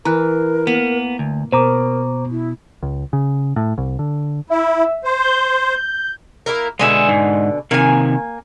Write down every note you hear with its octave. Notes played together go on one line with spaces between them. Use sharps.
E3 A#4 A#5 F#6
A#3 B3
D2
B2 A#4 C5 A#5 D6
E4
C#2
C#3
A2
C2
D3
E4 E5
C5
G6
A#3 E4 A#4
B2 D3 G#3 D#5 E5 G#5
G#2
C3 D#3 A#3 G#5